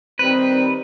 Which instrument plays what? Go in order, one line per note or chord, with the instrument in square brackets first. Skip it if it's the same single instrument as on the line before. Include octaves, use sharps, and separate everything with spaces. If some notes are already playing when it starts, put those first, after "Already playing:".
[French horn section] D#3 G3 C4 [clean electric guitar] B4